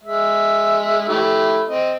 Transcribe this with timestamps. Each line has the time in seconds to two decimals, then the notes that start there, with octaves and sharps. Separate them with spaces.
0.03 G#3 E5
1.09 A3 E4 G4
1.68 C4 D#5